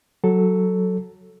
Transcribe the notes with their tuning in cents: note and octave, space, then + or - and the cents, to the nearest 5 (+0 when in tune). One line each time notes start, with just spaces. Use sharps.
F#3 +0 A4 +0